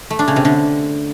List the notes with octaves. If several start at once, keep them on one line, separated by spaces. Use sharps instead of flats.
A3
D4
C#3
C3
D3